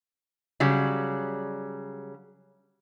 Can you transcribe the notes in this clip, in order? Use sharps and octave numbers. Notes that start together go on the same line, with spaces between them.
C#3 F#3 G3